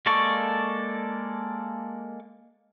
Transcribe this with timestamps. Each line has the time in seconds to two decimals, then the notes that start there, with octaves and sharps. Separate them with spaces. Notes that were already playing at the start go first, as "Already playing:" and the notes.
0.06 G#3 A#3 A4 D5 C#6